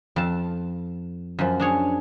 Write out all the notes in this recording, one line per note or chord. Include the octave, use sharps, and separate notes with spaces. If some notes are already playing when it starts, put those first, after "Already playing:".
F2 A5
F#2 F3
D4 G#4 C#5